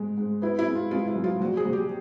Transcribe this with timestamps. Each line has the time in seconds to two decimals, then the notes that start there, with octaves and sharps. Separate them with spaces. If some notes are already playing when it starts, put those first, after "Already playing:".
Already playing: G#2 G#3
0.18 G#2
0.42 B3 E4
0.59 E4
0.68 G#3
0.75 F4
0.91 G#3 F4
1.07 E4
1.16 F#2
1.24 F4
1.40 A#1 F#4
1.57 G#4
1.65 A#1
1.73 G4